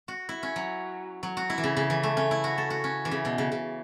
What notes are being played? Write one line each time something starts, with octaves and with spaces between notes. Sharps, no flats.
F#4
E4
C#4
F#3
F#3
F#4
E4
E3
C#3
C#3
E3
A3
C#4
E4
F#4
A4
F#4
C#4
E3
C#3
B2
C#3
C#3